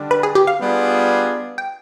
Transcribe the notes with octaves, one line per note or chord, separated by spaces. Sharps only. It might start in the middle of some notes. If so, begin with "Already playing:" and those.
Already playing: D3 G3 D4
B4
G#4
G4
F5
G3 B3 D4 F4 G#4
G5